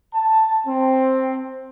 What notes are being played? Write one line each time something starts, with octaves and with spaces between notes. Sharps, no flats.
A5
C4